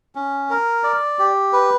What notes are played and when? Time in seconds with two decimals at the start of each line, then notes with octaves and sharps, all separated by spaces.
0.15 C#4
0.50 A#4
0.84 D5
1.19 G4
1.53 B4